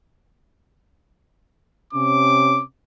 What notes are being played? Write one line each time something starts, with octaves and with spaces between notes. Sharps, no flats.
C3 C#4 D6